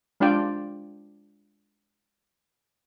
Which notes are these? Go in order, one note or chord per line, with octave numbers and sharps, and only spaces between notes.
G#3 D4 F4 D5 G5